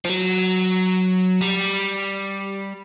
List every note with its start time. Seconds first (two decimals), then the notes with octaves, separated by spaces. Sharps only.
0.05 F3
0.09 F#3
1.41 G3